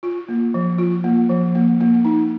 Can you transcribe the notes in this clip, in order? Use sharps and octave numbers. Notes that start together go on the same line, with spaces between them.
F4
A#3
F3
F4
A#3
F3
A#3
A#3
D#4